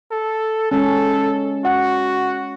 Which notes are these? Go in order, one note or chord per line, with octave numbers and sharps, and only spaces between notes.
A4
G#3 C#4 A4
F#4 F#5